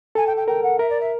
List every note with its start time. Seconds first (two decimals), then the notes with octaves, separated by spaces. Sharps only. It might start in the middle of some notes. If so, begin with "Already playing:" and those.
0.15 A4 G#5
0.26 G5
0.36 G5
0.48 A#4 G5
0.63 F#5
0.79 A#4 E5
0.89 D5
1.00 E5